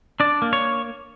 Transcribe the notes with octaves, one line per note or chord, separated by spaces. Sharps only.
D4 D5
A#3
C#5